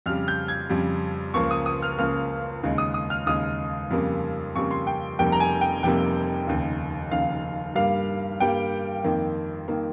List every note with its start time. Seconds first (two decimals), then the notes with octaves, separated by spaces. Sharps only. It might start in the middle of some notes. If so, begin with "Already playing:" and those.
0.06 F2 C#3 G3 F6
0.28 G6
0.48 G#6
0.69 F2 C#3 G3
1.34 C#2 C#3 F3 A#3 C#6
1.51 D#6
1.66 D#6
1.82 F6
1.98 C#2 C#3 F3 A#3 F6
2.63 D#2 C#3 G#3
2.78 D#6
2.94 D#6
3.10 F6
3.26 D#2 C#3 G#3 D#6
3.91 F2 C#3 G3 A#3
4.56 F2 C#3 G3 A#3 C#6
4.71 C6
4.87 G5
5.19 F1 F2 C3 G3 A#3 G5
5.32 A#5
5.40 G#5
5.61 G5
5.83 F1 F2 C3 G3 A#3 G5
6.47 F1 D#2 C#3
7.11 F1 D#2 C#3 F5
7.75 G2 G3 A#3 F5
8.40 G2 G3 A#3 G5
9.04 F2 D#3 A#3
9.68 D#3 A#3